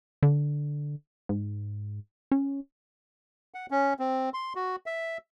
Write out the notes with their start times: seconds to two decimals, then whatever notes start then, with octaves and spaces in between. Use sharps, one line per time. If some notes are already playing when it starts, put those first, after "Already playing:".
0.23 D3
1.29 G#2
2.32 C#4
3.54 F#5
3.71 C#4
3.99 C4
4.34 C6
4.55 F#4
4.86 E5